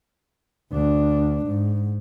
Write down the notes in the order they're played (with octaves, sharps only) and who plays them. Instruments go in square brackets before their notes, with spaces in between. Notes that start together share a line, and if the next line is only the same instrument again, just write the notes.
[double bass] D2 D4
G#2